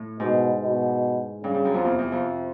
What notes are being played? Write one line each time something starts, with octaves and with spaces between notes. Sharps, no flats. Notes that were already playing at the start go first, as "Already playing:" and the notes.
Already playing: A2
G#2 B2
B2
G2 C#3
G2
F#2
F2
E2 C3
E2
F2